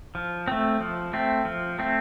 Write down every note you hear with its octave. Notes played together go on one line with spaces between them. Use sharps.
F3
A3 C4
F3
A3 C4
F3
A3 C4